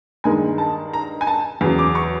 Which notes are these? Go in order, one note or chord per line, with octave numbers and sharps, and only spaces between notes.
G2 D#3 G#3 G#5
A5
A#5
G#5
A5
E2 C#3 F#3
D6
C#6